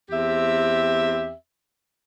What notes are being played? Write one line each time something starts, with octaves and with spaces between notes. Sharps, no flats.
E2 C4 G4 E5